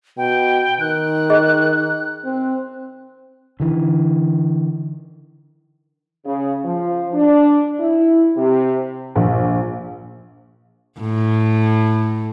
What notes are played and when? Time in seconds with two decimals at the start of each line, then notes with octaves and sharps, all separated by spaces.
0.18 B2 G5
0.80 D#3 F#6
1.30 G#4 D#5
2.24 C4
3.60 D3 E3
6.25 C#3
6.64 F3
7.14 D4
7.79 E4
8.36 C3
9.15 A#1
11.00 A2